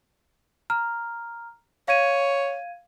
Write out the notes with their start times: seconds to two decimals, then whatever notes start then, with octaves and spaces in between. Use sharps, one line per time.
0.70 A#5 F6
1.88 C#5 F5 G#6 D#7